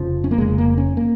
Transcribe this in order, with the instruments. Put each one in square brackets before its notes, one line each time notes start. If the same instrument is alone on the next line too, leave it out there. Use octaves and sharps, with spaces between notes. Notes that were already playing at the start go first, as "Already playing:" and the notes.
Already playing: [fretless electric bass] F1 F2 C#3 F3
C#4
A#3
F1 F2 C#3 G#3
A#3
C#4
A#3